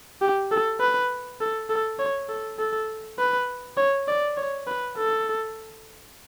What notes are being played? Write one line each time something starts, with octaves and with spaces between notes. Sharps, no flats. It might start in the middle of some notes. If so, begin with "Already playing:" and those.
G4
A4
B4
A4
A4
C#5
A4
A4
B4
C#5
D5
C#5
B4
A4